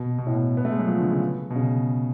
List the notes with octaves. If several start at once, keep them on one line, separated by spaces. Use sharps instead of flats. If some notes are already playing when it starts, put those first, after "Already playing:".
Already playing: B2
B2
A2
B2
B3
A3
G#3
F#3
F3
D3
C#3
B2
C#3